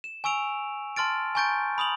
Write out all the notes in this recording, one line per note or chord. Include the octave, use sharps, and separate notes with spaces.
E7
G#5 C#6 E6 D7 F7
A5 C6 F6 A6 D7
G#5 A#5 C#6 G6 A6 D7
B5 D#6 F7 F#7